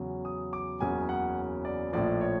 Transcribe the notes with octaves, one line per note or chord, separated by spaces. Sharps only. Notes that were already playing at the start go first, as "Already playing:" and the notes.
Already playing: E2 C#3 F#3
D#6
D6
F#1 E2 C#3 F#3 G#5
F#5
D5
A#1 A2 F3 D5
C#5